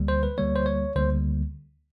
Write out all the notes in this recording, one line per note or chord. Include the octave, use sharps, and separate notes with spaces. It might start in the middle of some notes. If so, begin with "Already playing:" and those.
Already playing: D2 D3 G3 A#3
C5
B4
D2 D3 G3 A#3 C#5
C5
C#5
D2 D3 G3 A#3 C5